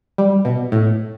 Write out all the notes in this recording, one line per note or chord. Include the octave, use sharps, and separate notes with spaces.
G3
B2
A2